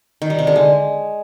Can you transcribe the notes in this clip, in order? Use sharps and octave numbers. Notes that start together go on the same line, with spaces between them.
D#3
G3
C3
D3
G#3